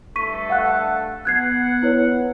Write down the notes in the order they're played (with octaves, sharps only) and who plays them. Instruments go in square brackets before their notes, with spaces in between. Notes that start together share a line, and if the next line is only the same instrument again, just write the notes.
[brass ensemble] G2 A3 A4 [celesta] C#6 B6 D#7
[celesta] F5 F#5 F#6
[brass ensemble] B3 F#5 [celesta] F#6 G#6 C7
[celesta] E4 B4 C#5